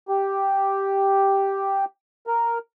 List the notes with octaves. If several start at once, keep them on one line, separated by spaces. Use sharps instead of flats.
G4
A#4